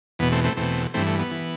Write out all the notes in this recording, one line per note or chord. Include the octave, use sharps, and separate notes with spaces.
E2 B2 B3
A3 C4
A3 C4
E2 B2 A3 C4
G2 E3 A3 C4
A3
B3
E3